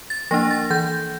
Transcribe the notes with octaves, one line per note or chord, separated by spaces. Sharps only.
A6
F3 A#3 D4 A#6
A6
E3 G6